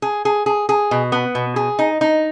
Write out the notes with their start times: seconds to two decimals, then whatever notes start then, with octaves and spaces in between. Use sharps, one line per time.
0.02 G#4
0.25 G#4
0.46 G#4
0.69 G#4
0.91 B2
1.12 B3
1.35 B2
1.56 G#4
1.79 D#4
2.01 D#4